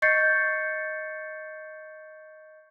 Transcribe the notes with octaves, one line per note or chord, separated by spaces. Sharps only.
D#5 C#6 G6 A6 C7 C#7